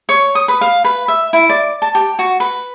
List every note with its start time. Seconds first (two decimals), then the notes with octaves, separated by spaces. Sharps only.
0.09 C#5
0.35 D#6
0.48 B4
0.61 F5
0.84 B4
1.08 E5
1.33 E4
1.49 D5
1.82 A5
1.95 G4
2.19 F#4
2.40 B4